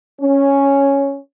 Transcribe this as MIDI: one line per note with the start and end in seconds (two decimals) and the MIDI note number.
0.21 1.19 61